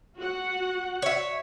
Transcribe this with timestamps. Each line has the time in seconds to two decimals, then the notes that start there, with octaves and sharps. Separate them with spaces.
0.19 F#4 F#5
1.02 C#5 E5